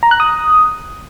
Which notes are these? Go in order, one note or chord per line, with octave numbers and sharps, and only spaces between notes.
A#5
F#6
D#6